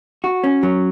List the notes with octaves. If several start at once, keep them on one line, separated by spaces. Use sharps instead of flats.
F#4
C#4
F#3